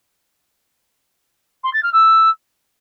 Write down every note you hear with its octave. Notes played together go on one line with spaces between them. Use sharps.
C6
A6
F6
E6